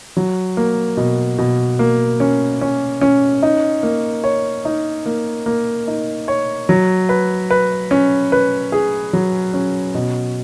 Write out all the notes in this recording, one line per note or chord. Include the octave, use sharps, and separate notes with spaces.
F#3
A#3
B2
B2
A#3
C#4
C#4
C#4
D#4
A#3
C#5
D#4
A#3
A#3
D#4
C#5
F#3
B4
B4
C#4
B4
G#4
F#3
C#4
B2